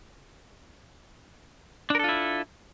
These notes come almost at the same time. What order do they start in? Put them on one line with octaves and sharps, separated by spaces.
D4 A#4 A4 F4 E4